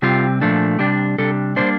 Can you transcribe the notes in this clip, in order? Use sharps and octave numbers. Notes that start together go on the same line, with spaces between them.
C3 G3 C4 F4
A#2 F3 A3 D4
C3 G3 D4 G4
C3 G3 D4 A4
C3 G3 A#3 D4 C5